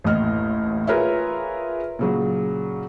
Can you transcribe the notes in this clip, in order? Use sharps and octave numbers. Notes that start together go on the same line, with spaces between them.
A1 D#2 A2 D#5 F6
F4 G#4 A#4 B4 C#5 E5
A#2 C#3 F#3